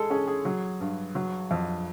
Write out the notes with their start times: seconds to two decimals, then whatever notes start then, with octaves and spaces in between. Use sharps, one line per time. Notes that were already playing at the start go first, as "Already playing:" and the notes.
Already playing: G#3 G#4 A4
0.10 C#4 G#4
0.27 G#4
0.45 F#3
0.81 G2
1.15 F#3
1.51 F2